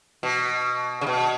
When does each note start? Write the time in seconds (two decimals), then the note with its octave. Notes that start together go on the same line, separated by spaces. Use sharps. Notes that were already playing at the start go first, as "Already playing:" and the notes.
0.23 B2
1.01 C#3
1.07 B2